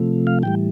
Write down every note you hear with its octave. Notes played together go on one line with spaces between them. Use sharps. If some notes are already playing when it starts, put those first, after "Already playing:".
Already playing: C3 F3 A3
F5
A2 E3 G3 G5